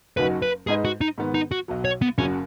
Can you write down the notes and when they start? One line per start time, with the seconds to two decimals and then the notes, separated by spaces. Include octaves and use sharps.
0.17 F#1 F#2 F#3 D#4 F#4 B4
0.42 B4
0.67 G#2 G#3 D#4 G#4 B4 D#5
0.85 F#4
1.01 D#4
1.18 G#2 D#3 B3
1.34 D#4
1.52 F#4
1.68 B1 B2 F#3
1.85 C#5
2.02 B3
2.18 F#1 F#2 C#3 F#3 C#4